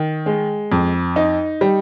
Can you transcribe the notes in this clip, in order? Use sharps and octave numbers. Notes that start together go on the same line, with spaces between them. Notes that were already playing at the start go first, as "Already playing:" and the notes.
Already playing: D#3
G#3
F2
D#4
G3